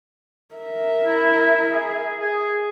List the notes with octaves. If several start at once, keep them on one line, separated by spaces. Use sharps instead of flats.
A#4 E5
E4
G#4
G#4